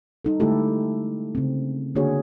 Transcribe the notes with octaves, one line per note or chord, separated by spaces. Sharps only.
G3 D#4 A4
D3 G#3 A3 E4 G4 A4
C#3 C4
D3 A#3 D4 F#4 G#4 C#5